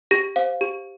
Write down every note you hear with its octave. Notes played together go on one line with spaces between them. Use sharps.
G4 A#6
C5 F5
G4